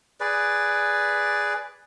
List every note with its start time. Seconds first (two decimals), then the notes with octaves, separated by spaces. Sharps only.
0.20 G#4 B4 D5